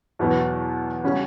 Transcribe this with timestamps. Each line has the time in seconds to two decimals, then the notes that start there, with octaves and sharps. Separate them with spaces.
0.19 E2 B2 F#3 B3
1.04 C#3 G3 C#4 F#4